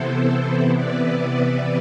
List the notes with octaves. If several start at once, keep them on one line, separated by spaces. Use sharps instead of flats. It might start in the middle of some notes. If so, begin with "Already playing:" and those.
Already playing: C3 E3 B3 E4 A4 C5
B4 D5